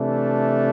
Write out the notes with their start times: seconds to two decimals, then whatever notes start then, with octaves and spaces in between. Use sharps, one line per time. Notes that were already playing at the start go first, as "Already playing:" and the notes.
Already playing: C3 E3 A3 D4